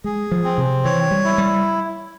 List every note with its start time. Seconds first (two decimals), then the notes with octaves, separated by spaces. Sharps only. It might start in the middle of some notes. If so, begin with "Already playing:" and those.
0.04 G#3 G#4
0.31 F3
0.44 C4
0.58 C3
0.85 E3 C#5
1.11 G3
1.24 E4
1.38 G3